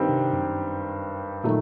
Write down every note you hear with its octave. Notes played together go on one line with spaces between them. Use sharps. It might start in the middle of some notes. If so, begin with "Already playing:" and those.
Already playing: G2 D#3 G3 C4
C3
F#2
A#2 D#3 F#3 A3